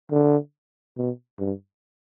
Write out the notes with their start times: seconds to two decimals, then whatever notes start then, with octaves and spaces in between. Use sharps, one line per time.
0.11 D3
0.97 B2
1.39 G2